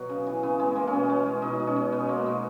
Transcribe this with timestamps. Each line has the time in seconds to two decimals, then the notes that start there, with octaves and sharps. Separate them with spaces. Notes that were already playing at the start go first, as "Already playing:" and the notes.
Already playing: B2 F#3 F#4
0.09 C#3
0.27 E3
0.43 C#3 B3
0.59 G#3 B3
0.76 E3 A#3
0.87 C#4
0.93 B2 B3
1.10 G#3
1.26 G#3
1.42 B2 D#4
1.60 B2
1.67 C#4
1.76 B2
1.92 B2 B3
2.09 G#3 A#3
2.26 B2 B3